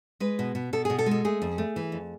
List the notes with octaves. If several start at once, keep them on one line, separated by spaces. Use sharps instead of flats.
G#3 B4
B2
B2
B2 A4
B2 G#4
A4
G#3
A4
A3 G#4
F2
A3
E3
F2